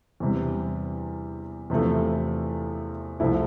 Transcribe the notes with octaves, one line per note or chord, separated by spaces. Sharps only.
E2 C3 G3
E2 C3 F3 A3
C2 C3 F3 A3 E4